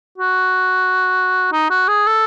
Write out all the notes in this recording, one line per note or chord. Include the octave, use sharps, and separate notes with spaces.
F#4
D#4
F#4
G#4
A4